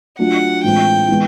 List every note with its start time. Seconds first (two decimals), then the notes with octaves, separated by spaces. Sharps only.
0.19 F#3 A3 D4 F4 F#5
0.64 A2 E3 G#3 C4 F4 G5
1.08 E3 G#3 B3